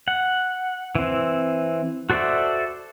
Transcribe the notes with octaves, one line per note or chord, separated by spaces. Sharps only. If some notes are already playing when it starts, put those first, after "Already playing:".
F#5
E3 C4
F#4 A4 C5 D5 E5